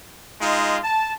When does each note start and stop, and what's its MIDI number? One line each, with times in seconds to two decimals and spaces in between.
0.42 0.79 56
0.42 0.79 63
0.42 0.79 65
0.84 1.13 81